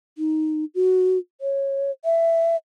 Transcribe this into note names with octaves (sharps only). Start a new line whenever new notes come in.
D#4
F#4
C#5
E5